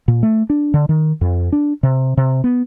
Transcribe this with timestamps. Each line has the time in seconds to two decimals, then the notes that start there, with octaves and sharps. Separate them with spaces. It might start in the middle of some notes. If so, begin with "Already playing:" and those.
0.08 A#2
0.23 A3
0.50 D4
0.74 D3
0.89 D#3
1.21 F2
1.52 D4
1.83 C3
2.17 C3
2.44 B3